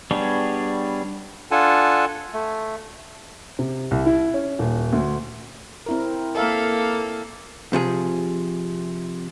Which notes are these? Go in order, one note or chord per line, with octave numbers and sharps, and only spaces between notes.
G3 B3 D4 G#4 C#5
D4 F4 A4 F#5 G#5 A5
A3
C3
C2
E4
C#4
D#1
D2
C4 E4 A#4
A#3 A4 A#4 E5 F5
C3 F3 G#4